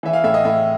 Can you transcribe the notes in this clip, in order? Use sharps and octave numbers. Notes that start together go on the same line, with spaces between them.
E3 E5
F5
A2 E5
D#5
A2 E5